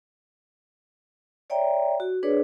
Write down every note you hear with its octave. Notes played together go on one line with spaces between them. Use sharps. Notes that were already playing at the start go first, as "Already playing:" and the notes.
C#5 D5 E5 G5 A#5
F#4
D4 G#4 B4 C#5 D5